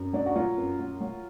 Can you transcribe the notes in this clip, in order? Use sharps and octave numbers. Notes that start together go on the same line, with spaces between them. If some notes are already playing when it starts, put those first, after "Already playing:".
Already playing: F#2
F#3 D4
F#4
F#3 F4
F#2
F#3
F#3